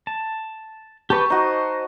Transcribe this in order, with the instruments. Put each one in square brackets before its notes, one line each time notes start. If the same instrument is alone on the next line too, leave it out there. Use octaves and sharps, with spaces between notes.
[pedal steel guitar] A5
[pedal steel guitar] G4 B4 [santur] A5 C#6
[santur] D#4 F#4 [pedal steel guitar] C5 D#5